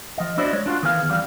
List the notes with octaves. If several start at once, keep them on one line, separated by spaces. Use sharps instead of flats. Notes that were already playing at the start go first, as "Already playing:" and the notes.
F3 D#5
D4 E4 F#4 C5 D5 D#5
G#3 C#5
D4 F4 F#4
D#3 E3 B3 G#4 D5 F5
F2 E3 G3 G4 F5